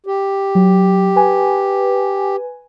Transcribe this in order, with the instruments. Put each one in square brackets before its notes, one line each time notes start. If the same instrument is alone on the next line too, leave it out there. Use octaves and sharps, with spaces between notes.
[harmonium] G4
[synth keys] F#3
B4 G#5